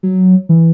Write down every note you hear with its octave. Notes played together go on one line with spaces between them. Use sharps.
F#3
E3